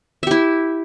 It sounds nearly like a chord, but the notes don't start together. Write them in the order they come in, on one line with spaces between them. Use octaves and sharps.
E5 G4 E4